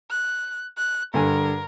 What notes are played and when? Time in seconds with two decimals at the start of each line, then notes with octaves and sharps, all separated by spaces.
0.10 F#6
0.77 F#6
1.14 G2 D3 A#4 G#5